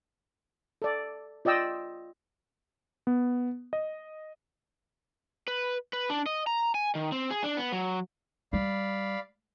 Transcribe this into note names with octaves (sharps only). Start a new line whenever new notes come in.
A4 D5
F4 D5 D#5 G5 E6
B3
D#5
B4
B4
D4
D#5
A#5
G#5
D#3
C4
G#4
D4
B3
F#3
G3 D5 F5 B5